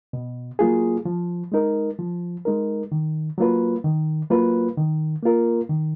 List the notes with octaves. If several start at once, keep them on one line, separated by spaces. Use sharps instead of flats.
B2
F#3 A#3 F4 G#4
F3
G#3 D#4 A#4
F3
G#3 D#4 A#4
D#3
F#3 A#3 F4 B4
D#3
F#3 A#3 F4 B4
D#3
A#3 F4 A#4
D#3